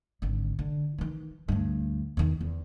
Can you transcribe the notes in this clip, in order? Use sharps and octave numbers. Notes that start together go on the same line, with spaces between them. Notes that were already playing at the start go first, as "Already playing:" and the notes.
G#1 D3
D3
D#3 E3
D2 G2
E2 D#3
E2